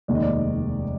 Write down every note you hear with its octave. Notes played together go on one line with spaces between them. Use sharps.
F1 D#2 D#3 G#3 D5
D#5
D5